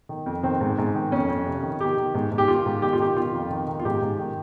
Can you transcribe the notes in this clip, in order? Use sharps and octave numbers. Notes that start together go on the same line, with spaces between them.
D#3
F2
D#3 C4
G#2
G#2
D#3
F2 C#4
F2
C3
D#3
D#3 G4
D#3
G#2
G#2
G4
D#3 F4
G#2
D#3 G4
F4
D#3 G4
D#3 F4
F2
D#3
D#3
F4
G#2 G4
G#2
D#3